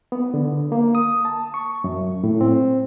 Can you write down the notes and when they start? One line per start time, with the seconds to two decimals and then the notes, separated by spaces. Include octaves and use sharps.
0.12 B3
0.34 D3
0.72 A#3
0.95 D#6
1.25 A5
1.54 C#6
1.84 F#2
2.24 A2
2.41 C4